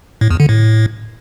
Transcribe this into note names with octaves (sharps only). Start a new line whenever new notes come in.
A2
E2
D3
A2